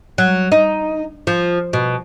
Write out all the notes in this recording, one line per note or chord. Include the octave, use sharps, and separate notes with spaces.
F#3
D#4
F3
B2